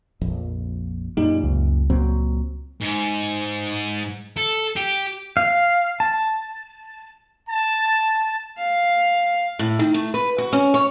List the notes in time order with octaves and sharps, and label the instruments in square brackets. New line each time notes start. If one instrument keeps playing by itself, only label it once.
[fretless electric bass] A#1 F2
[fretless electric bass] F#2 A#2 G3 [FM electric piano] D#4
[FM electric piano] C#2
[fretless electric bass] A#2 F#3 C4
[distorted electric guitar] G#2
A4
G4
[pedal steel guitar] F5
A5
[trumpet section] A5
[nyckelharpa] F5
[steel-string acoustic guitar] A2
D#3
A3
B4
F#4
C#4
C#5